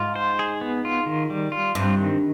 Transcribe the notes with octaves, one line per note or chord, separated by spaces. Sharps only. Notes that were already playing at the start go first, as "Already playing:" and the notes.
Already playing: G#2 F4
C5
G#4
B3
F4
D#3
G3
F4
G2 C4
D#3